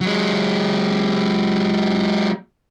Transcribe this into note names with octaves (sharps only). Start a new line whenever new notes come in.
F#3 G#3